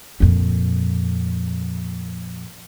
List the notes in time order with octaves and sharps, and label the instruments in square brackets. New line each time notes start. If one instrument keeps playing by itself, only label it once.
[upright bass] F2 A#2